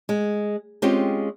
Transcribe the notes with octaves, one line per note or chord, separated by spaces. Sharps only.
G#3
G#3 C4 C#4 F4 G4